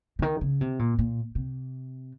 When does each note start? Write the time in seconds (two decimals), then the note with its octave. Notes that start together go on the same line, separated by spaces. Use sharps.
0.19 C#3
0.22 D#3
0.41 C#3
0.61 C3
0.79 A#2
0.99 A#2
1.35 C3